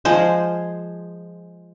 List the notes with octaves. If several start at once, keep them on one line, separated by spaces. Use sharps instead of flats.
F3 G#3 G#4 C5